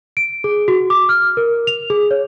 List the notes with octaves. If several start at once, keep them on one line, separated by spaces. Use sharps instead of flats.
D7
G#4
F#4
D6
F6
A#4
F7
G#4
C#5